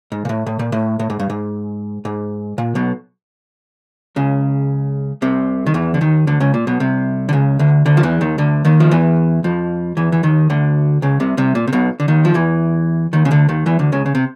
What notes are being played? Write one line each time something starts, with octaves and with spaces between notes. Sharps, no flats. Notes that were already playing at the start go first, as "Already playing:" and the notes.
G#2
A#2
A2
A2
A#2
A2
A2
G#2
G2
G#2
G#2
A#2
B1 B2
C#2 C#3
C2 C3
D#3
E2 E3
D3
D#2 D#3
D2 D3
C#2 C#3
A#2
B1 B2
C2 C3
D3
C#2 C#3
D2 D3
D2 D3
F3
E2 E3
D#2 D#3
D2 D3
D#2 D#3
F3
E2 E3
F2 F3
E2 E3
E3
D#2 D#3
D2 D3
C#2 C#3
C2 C3
C2 C3
A#2
C3
B1 B2
D3
D#2 D#3
F3
E2 E3
D#2 D#3
C#3
D2 D3
D#2 D#3
E2 E3
D2 D3
C#2 C#3
C#3
C3